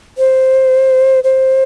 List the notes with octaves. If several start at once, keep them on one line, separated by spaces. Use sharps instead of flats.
C5
C5